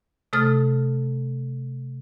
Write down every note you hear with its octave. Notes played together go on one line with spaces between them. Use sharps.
C3 A3 A4 D#6 F6 A6